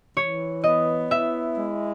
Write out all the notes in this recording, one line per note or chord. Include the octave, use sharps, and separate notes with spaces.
E3 C#5
B3 D#5
E4 E5
G#3